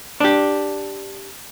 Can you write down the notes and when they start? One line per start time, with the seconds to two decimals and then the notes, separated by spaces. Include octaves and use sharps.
0.20 D4 G4